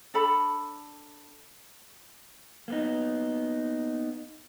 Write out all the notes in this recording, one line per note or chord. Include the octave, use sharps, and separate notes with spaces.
D4 A4 B5
A#3 B3 D#4